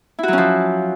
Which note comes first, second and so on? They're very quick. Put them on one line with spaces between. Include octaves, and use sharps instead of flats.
E4 F#4 F#3 C#4 F3